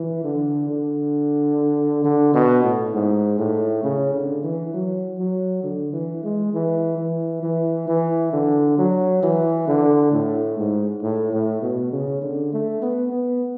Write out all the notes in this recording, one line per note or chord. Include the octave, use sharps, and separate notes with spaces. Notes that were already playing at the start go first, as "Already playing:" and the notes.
Already playing: E3
D3
D3
D3
B2
A2
G#2
A2
C#3
D3
E3
F#3
F#3
D3
E3
G#3
E3
E3
E3
E3
D3
F#3
E3
D3
A2
G#2
A2
A2
B2
C#3
D3
A3
B3
B3